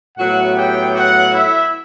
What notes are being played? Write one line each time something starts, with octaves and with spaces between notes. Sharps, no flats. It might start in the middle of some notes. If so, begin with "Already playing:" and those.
A2 F#3 B3 F#4 F#5
G4 G5
F#4 F#5
E4 E5